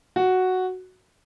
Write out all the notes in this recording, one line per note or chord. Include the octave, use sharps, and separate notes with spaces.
F#4